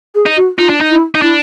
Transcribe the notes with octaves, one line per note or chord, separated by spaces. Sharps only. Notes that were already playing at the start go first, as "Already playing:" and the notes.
G#4
D#4
F#4
D#4 F4
D4
D#4
E4
D#4
D4 E4